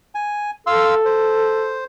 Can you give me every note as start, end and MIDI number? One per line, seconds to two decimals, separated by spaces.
0.15 0.51 80
0.67 1.85 69
0.67 0.95 77
0.67 0.95 84
0.67 0.95 88
1.05 1.84 72